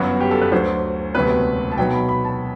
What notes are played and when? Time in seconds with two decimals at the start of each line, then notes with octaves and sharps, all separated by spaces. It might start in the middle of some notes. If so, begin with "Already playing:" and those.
Already playing: G1 F#2 F#3 B3 F#4
0.21 G4
0.31 A4
0.42 B4
0.52 D2 D3 F#3 C5
1.14 E1 D2 C3 F#3 B3 B4
1.71 A5
1.78 B1 B2 F#3 B3 G5
1.93 B5
2.09 B5
2.25 A5